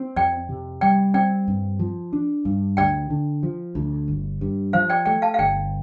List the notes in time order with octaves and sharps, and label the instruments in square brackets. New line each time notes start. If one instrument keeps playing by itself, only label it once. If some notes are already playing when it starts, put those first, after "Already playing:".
Already playing: [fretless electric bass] C4
[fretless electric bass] F2 [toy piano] D5 G5
[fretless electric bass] C3
[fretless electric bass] G3 [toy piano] D5 G5
[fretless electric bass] C4 [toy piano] D5 G5
[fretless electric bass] G2
F3
D4
G2
[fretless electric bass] D2 [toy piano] D5 G5
[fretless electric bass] D3
F3
D2
G1
G2
[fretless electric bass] F3 [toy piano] C5 F5
[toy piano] D5 G5
[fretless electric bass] A3 [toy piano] D5 G5
[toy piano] F5 A5
F5
[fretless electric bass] G1 [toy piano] D5 G5